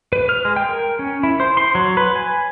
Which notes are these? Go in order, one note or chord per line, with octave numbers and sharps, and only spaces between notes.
B4
F6
G#3
G5
A#4
C#4
E4
C5
C6
F#3
B4
G#5